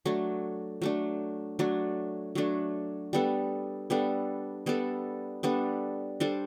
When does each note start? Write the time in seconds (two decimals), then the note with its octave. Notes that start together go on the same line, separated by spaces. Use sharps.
0.05 F#3 A3 D4
0.82 F#3 A3 D4
1.59 F#3 A3 D4
2.35 F#3 A3 D4
3.13 G3 B3 D4 A4
3.90 G3 B3 D4 A4
4.66 G3 B3 D4 A4
5.43 G3 B3 D4 A4
6.20 G3 D4 A4 C5